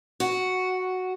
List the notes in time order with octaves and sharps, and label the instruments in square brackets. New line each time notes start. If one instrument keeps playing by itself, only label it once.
[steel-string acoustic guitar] F#4